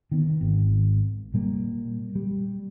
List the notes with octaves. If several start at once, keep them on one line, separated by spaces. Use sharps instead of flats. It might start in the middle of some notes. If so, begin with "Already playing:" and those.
D#3 B3
G#1
A#2 G3 A#3
G3